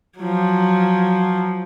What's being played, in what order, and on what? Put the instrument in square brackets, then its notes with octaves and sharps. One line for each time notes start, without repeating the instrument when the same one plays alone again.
[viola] F3 F#3